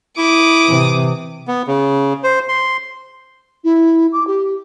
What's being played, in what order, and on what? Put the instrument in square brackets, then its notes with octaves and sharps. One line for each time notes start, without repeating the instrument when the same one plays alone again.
[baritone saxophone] E4 [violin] D6 D#6
[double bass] C3 E3
[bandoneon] B3
C#3
C5
C6
[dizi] E4
D6
G4